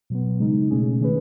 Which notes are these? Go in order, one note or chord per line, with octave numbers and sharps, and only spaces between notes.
B2 F#3 B3
C#3 G#3 D#4
B2 A3 C#4 G#4
D#3 A3 C#4 G#4 B4